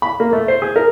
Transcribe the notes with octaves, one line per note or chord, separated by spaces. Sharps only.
B5
A#3
A3
C5
G#4
A#4